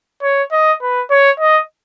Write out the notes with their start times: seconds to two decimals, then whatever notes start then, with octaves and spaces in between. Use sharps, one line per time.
0.22 C#5
0.52 D#5
0.82 B4
1.10 C#5
1.40 D#5